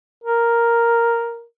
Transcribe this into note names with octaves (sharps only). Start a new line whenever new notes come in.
A#4